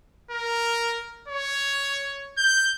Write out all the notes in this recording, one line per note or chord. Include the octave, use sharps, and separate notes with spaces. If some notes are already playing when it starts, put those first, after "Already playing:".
A#4
C#5
G6